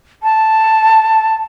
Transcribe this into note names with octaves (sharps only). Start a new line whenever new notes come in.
A5